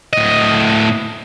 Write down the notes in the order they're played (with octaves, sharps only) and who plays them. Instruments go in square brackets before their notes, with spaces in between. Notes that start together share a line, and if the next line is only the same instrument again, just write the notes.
[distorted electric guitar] A2 D#5